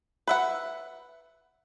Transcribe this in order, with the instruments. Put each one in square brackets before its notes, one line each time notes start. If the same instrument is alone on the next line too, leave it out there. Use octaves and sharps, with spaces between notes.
[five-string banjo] B4 E5 F#5